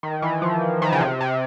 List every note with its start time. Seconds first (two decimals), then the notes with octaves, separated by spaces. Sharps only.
0.03 D#3
0.22 E3
0.42 F3
0.82 D#3
0.92 C#3
1.01 C3
1.21 C3